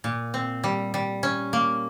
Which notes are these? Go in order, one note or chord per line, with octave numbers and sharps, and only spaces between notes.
A#2
C4
G3
G3
C#4
A#3